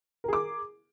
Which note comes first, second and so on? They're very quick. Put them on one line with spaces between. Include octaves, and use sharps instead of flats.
A#4 G#4 D6